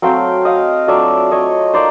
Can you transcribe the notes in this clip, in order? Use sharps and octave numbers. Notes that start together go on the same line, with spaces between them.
F#3 A3 C4 F5 G5
D#5 F5
F#3 A3 D4 F4 D5 E5
C#5 D#5
A#3 D#4 C5 D5